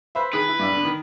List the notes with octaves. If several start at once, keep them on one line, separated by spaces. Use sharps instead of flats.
B4 C5 E5
D#3 G#4 B4
E4
G2 D5 E5
D3 B3
D#3